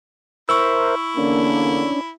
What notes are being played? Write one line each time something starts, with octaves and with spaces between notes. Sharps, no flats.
E4 A#4 C5 E5 C#6 E6
E2 D3 A#3 C#4 D4